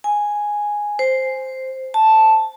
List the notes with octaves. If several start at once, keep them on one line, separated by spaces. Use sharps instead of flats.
G#5
C5
A5